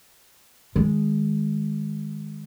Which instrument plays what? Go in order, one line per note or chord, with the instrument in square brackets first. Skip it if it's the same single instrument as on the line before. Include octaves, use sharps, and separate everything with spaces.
[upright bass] D#3 G#3